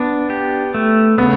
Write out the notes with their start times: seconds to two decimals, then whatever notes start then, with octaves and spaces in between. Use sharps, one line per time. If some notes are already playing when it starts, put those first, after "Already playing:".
Already playing: B3 D4
0.30 G4
0.74 A3
1.18 C#3 B3